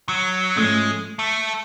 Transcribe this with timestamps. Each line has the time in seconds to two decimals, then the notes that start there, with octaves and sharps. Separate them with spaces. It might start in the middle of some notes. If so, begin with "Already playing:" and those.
0.09 F#3
0.56 G#2 F3 G#3 A3 C#4
1.19 A3